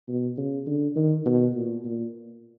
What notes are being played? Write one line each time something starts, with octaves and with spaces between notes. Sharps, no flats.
B2
C#3
D3
D#3
B2
A#2
A#2